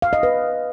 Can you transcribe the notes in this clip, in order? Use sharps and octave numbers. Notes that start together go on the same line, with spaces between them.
F5
D#5
B4